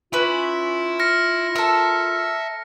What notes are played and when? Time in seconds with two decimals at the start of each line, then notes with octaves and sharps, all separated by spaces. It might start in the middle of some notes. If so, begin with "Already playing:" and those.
0.13 C#4 E4 F4 B4
0.99 F6 A#6 C#7
1.56 A4 A#4 E5